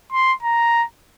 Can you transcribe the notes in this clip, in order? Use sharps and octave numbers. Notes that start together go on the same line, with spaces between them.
C6
A#5